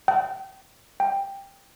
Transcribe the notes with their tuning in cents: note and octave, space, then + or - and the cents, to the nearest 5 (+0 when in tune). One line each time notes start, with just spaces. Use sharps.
G5 -30
G5 +10